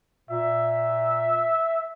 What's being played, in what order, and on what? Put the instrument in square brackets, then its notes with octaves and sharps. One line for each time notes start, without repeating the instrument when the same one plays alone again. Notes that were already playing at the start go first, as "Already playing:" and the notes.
[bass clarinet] A#2 [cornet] E5